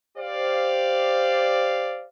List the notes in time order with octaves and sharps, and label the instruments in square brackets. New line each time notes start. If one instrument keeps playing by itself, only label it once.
[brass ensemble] G4 C5 D5 F5